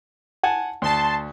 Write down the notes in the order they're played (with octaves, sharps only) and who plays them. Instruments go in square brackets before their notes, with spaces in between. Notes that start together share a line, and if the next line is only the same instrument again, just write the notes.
[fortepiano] F#5 G#5 A5
[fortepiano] D2 [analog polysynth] A5 C6